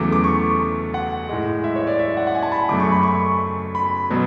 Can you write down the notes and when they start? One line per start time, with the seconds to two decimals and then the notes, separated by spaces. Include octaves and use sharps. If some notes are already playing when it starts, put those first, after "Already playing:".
Already playing: E2 C#3 F#3 A3 D6
0.12 D6
0.24 C#6
0.94 F#5
1.29 A2 G#3
1.64 E5
1.76 C#5
1.87 D5
1.99 E5
2.17 F#5
2.27 F#5
2.35 G#5
2.43 A5
2.52 B5
2.69 F#2 C#3 F#3 A3 D6
2.80 C#6
2.92 B5
3.03 C#6
3.75 B5
4.10 B2 F#3